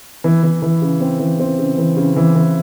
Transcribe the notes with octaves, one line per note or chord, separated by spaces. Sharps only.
E3
E3
E3
C#3
C4
E3
C4
C#3
E3
C#3
E3
E3